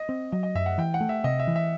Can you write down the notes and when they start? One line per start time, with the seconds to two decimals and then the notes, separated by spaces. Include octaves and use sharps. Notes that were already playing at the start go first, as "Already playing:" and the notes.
Already playing: D#5
0.09 C4
0.32 F#3 D#5
0.43 D#5
0.55 F#2 E5
0.66 F#5
0.78 E3 G5
0.94 F#5
1.01 A3
1.09 E5
1.24 C3 D#5
1.39 E5
1.47 E3
1.56 E5